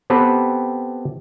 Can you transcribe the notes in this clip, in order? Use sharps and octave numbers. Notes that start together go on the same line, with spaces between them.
B3 C4 G4 A4 B4